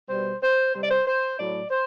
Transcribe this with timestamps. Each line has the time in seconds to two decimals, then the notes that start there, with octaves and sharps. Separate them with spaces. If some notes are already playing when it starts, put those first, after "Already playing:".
0.09 B2 G3 C5
0.41 C5
0.73 C3 G3 C5
0.82 D5
0.91 C5
1.06 C5
1.37 A2 F#3 D5
1.70 C5